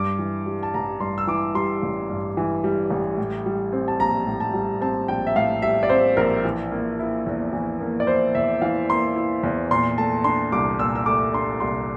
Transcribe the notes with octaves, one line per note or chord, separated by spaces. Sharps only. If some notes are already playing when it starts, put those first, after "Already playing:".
Already playing: G2 D6
E3
G3
A5
A1 A#5
G2 C6
E6
E3 D6
G3 C6
A1
G2
E3
G3
A1
A2
G3
C4
A5
A#1 A#5
A2
A5
G3
C4 A5
A#1 G5
E5
A2 F5
G3 E5
D5
C4 C5
A#1 A#4
E3
A#3
E4
E2
E3
A#3
D5
E4 C5
E2 E5
E3 F5
A#3 C6
E4
E2
A#2 C6
A3 A5
D4 C6
C2 D6
A#2 E6
E6
A3 D6
D4 C6
C2 C6